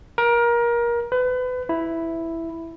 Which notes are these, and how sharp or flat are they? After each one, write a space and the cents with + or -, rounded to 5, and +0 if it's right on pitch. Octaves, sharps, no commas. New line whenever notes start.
A#4 +25
B4 +30
E4 +0